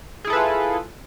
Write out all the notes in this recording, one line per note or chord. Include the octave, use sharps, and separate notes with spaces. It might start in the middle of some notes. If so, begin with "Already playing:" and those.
E4 F4 G#4 A4 B4